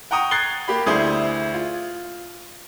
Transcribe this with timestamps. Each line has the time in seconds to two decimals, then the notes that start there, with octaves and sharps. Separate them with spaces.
0.11 F#5 G5 A#5 C#6 D#6
0.31 F#6 G#6 A6 C7 G7
0.68 A#3 G4 B5
0.86 D2 E4 G#4 C5 D5 D#6
1.54 F4